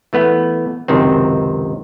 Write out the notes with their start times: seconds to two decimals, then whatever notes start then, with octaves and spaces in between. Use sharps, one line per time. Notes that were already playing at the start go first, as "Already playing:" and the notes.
0.13 E3 A3 B3 B4
0.88 C#2 F#2 C3 D#3 C4